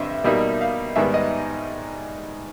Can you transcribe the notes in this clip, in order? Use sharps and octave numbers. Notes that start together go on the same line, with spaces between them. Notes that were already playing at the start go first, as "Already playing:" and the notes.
Already playing: G2 D3 G3 C4 D#5 E5
B2 G3 A#3 D#4 E5
F5
G#2 D#3 G3 B3 E5
D#5